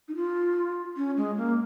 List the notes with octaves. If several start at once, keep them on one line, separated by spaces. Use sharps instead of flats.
D#4
F4
C#4
G#3
A#3